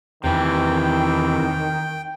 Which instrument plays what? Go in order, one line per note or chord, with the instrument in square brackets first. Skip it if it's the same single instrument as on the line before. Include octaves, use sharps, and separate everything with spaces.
[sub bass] E2 [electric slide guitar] C3 E3 [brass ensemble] D#3 [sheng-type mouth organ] G5